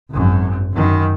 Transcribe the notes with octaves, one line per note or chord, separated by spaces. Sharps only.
G#1 F#2
F#2 D#3